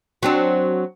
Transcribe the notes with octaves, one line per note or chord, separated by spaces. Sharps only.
F#3 C4 D4